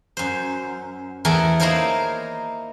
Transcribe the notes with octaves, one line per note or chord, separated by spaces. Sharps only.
F#2 C5
E2 E3 A3 E4 A#4 A5
A#3 D#4 E4 A#4 C5 C#5